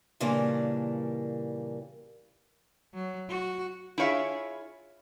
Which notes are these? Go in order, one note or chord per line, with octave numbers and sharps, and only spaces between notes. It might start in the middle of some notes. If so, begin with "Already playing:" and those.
A#2 C#3 E3 G3 A#3 D4
F#3
F#4
E4 F4 G#4 C#5 E5 F5